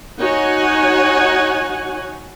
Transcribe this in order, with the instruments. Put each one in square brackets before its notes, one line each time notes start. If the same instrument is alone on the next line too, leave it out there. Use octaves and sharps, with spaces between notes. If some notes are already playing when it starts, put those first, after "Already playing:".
[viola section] D#4 F#4 C#5 F#5 G#5